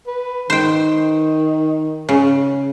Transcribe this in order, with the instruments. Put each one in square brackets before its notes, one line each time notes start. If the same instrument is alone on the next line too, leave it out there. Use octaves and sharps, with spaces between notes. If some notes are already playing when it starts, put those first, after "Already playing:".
[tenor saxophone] B4
[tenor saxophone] D#3 [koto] C5 G5
[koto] C#3